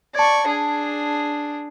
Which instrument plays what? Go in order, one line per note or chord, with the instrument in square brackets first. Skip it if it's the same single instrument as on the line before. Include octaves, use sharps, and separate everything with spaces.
[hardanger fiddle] D5 C#6 [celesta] A5 G#6
[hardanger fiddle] D4 G#4